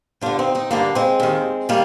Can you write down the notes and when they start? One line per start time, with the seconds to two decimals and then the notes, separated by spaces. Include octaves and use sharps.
0.21 G2 D3 D4 F4
0.39 C4 D#4
0.55 C4 D#4
0.71 G2 D3 A#3 D4
0.95 G#3 C4
1.20 D#2 D#3
1.69 D#3 G3 A#3